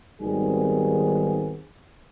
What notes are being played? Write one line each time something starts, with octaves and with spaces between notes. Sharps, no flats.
G#1 D#3 G3 B3 C4 G#4